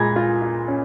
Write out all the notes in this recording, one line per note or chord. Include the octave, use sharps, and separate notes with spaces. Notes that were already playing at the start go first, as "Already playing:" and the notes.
Already playing: A#2 G#3 G#5 A#5 B5 G#6 A#6
F4
F4
C#4